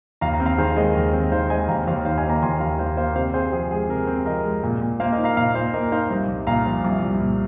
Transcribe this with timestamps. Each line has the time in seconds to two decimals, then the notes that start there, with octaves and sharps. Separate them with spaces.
0.21 D#2 F5 A#5
0.34 F5 A#5
0.40 C4
0.46 F5 A#5
0.58 D#3 G#4 C5
0.76 G#3 A#4 D#5
0.95 D#2
1.13 C4
1.32 D#3 C5 F5
1.50 G#3 D#5 G#5
1.68 D#2 F5 A#5
1.87 D#2 C5 F5
2.05 D#3 C5 F5
2.18 D#5 G#5
2.24 A#3
2.30 F5 A#5
2.42 D#2 G#5 C6
2.60 D#2 F5 A#5
2.79 D#3 C5 F5
2.97 A#3 C5 F5
3.16 C3 C5 F5
3.34 C4 G#4 C5
3.52 F3 G#4
3.71 G#3 G#4
3.89 C3 A#4
4.07 C4
4.26 F3 A#4 D#5
4.45 G#3
4.63 A#2
4.81 A#2
5.00 A#3 C5 F5
5.13 A#4 D#5
5.18 D#4
5.24 F5 A#5
5.37 A#2 F5 A#5
5.55 A#2 C5 F5
5.73 A#3 A#4 D#5
5.92 D#4 C5 F5
6.10 C2
6.28 C2
6.47 A#2 F5 A#5
6.65 F3
6.84 C2
7.02 C2
7.21 A#2